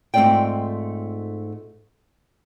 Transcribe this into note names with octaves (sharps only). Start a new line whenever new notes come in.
G#2 A3 C4 F4 D5 G5